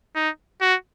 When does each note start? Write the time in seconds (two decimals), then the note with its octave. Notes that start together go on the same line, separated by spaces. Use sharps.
0.15 D#4
0.61 F#4